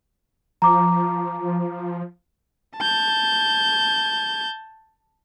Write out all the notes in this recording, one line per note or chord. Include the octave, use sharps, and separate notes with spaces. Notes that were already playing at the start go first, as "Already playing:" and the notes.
F3 A#5 D6
A5 G6